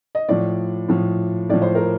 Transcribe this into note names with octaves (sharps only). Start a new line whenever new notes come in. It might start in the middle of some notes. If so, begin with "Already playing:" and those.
D#5
A2 F3 D5
A2 F3
A2 F3 D5
C5
A#4